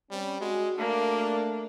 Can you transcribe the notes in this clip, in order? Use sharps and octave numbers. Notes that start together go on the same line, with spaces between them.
G3 C4 C#4
G#3 F#4
A3 A#3 D4